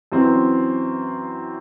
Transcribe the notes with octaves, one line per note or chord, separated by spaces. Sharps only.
F#2 E3 C4